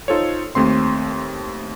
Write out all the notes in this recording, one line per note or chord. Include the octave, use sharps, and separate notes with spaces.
D#4 F4 A4 C5 C#5
D#2 A3 C4 C6